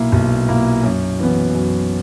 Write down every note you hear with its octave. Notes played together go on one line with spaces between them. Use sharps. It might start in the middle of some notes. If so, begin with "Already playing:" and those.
Already playing: B1 A#2 A#3 E4
B1
A#2 A#3 E4
F#2
E3 B3
F#2